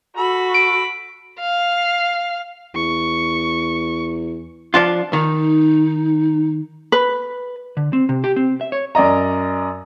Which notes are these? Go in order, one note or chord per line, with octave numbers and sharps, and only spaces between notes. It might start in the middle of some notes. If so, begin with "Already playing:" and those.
F#4 A4 B5
D7
F5
E2 C#6
F3 D4 F4
D#3 D#4
B4
D3
C4
C3
G4
C4
E5
C#5
F#2 D5 D#5 A#5